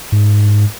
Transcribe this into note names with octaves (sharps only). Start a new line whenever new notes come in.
G#2